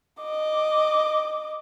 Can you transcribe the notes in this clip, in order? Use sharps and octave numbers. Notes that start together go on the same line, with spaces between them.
D#5 D6